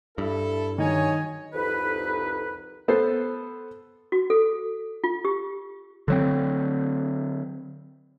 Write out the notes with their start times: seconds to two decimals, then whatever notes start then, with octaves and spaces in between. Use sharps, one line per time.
0.18 G2 E4 A4
0.78 D#3 F#3 G#4 C#5 D#5 G#5
1.54 C2 F2 D3 D#4 B4
2.88 B3 A4 C5
4.12 F#4
4.30 A4
5.04 F4
5.25 G4
6.08 D3 F#3 C4